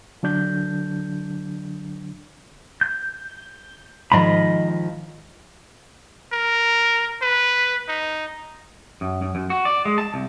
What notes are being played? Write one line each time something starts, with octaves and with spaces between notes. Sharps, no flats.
D3 F#3 D4 G6
G6
G#2 D#3 F3 D#5 B5
A#4
B4
D#4
F#2
F#2
F#2
F#4
D5
G#3
A5
C2